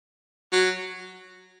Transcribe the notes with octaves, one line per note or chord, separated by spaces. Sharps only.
F#3